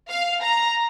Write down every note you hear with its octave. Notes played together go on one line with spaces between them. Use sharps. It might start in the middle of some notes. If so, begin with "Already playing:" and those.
F5
A#5